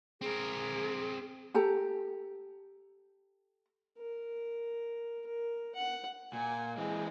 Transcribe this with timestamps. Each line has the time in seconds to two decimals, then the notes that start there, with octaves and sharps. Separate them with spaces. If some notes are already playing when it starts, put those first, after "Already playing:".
0.21 C4 G#4 A#4
1.54 G4 A4 A5 A#5
3.98 A#4
5.26 A#4
5.75 F#5
6.33 A#2 G#5
6.77 E3 G#3 C4